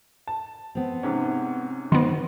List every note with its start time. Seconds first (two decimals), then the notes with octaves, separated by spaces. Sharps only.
0.27 A5
0.75 B3 C4
1.03 G#2 C3 C#4
1.92 D#3 F#3 B3 C4 D#5 C6